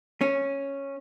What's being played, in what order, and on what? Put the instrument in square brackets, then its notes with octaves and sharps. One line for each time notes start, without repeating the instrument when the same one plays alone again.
[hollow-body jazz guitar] C#4